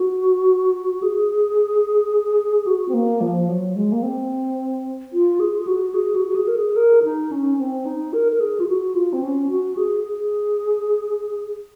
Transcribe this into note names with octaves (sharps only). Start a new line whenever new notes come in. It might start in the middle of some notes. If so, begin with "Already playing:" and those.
Already playing: F#4
G#4
F#4
C4
A#3
F3
F#3
G#3
A#3
C4
F4
G#4
G#4
F#4
G#4
F#4
F#4
G#4
A#4
G#4
A#4
D#4
C#4
C4
D#4
A#4
A#4
G#4
F4
F#4
F4
C4
C#4
F#4
G#4
G#4